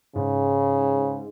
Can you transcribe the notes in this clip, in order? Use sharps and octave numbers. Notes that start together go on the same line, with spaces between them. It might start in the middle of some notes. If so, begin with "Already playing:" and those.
G#2 C#3